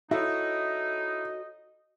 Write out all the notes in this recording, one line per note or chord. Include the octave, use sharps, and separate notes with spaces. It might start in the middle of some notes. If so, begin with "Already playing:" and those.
D#4 E4 F#4 A4 C#5 D#5